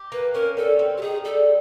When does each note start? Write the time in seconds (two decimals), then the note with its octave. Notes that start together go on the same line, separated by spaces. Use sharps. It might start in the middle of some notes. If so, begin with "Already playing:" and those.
Already playing: G4
0.12 A#3 B4
0.34 C#4 A#4
0.57 G3 A4
0.79 C4
0.98 G4
1.02 D#4 G#4
1.25 G3 A4